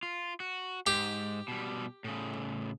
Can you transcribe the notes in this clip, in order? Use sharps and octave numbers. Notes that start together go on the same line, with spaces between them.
F4
F#4
G#2 G4
B2 G3
A2 C#3